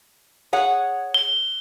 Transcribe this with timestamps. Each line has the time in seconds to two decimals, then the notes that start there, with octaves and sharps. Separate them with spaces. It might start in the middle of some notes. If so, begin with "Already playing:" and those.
0.53 G#4 C#5 F#5
1.14 G7